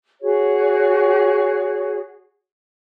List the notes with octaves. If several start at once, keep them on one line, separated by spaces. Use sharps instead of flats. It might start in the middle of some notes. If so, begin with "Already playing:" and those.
F#4 G#4 C#5